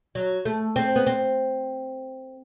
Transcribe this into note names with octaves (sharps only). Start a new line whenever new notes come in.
F#3
A3
C4
B3
C4